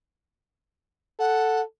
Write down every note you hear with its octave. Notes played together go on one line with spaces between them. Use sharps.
A4 F#5